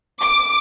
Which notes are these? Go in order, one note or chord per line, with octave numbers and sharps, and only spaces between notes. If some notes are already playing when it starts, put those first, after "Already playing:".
D6